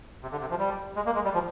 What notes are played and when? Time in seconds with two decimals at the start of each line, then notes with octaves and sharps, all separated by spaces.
0.22 C3
0.32 D3
0.41 C3
0.50 F3
0.59 G3
0.96 G#3
1.06 A#3
1.15 G#3
1.24 G3
1.34 F3